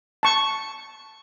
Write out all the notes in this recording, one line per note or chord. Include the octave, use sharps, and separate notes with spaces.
A5 C#6